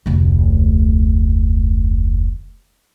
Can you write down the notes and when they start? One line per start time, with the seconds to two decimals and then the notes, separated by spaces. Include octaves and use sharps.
0.06 F1 D2